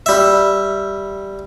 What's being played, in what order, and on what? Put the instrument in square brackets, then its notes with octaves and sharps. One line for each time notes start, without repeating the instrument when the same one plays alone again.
[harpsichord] G3 E5